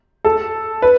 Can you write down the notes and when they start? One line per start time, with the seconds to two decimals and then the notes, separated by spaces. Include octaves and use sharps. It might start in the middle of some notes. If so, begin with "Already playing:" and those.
0.25 A4
0.82 B4